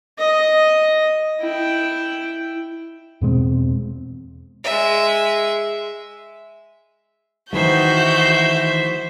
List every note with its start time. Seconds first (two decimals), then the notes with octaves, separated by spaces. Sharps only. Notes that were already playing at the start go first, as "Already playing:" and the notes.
0.18 D#5
1.40 E4 G5
3.21 E2 B2 G#3 C4
4.64 G#3 E5
7.53 D#3 E3 A3 F#4 C5 E5 G6